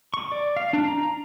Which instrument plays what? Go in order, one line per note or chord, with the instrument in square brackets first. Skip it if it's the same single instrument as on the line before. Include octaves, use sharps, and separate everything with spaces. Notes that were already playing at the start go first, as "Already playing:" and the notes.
[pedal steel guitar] C#6
D5
F5
D4
A#5